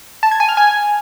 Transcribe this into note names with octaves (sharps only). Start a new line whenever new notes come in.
A5
G#6
G#5
F6
G#5